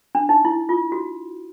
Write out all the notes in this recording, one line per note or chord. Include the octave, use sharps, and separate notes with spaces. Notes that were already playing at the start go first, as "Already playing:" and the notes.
D4
D#4
E4
F4
F#4